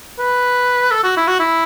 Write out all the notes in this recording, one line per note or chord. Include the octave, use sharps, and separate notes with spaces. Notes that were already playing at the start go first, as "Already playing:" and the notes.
B4
A4
F#4
E4
F#4
E4